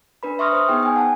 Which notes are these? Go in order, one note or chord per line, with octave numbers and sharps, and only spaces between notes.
D4 B4 B5
E5 C6 C#6 D#6 F6 A#6
C5 D#6
B3 D#4 G#4 G5
G5 G#5
F#5 A5